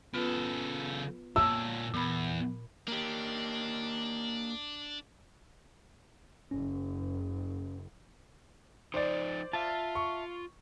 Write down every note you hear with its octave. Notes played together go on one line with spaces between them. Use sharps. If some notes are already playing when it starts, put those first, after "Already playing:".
C#3 B3 F4 A4 B4
A#2 C#5 A5 E6
E2 A#2 B5
A#3 D4 G4
F#1 C#4
F3 D#4 C5 D5
F4 E5 A5
C#6